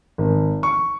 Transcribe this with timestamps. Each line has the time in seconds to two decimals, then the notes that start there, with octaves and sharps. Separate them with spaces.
0.18 G#1
0.63 C#6